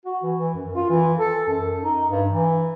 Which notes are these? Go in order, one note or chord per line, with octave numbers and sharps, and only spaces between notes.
F#4
E3
E3
F#2
F4
E3
A4
F#2
D#4
G2
E3